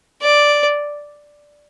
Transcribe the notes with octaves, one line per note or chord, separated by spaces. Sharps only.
D5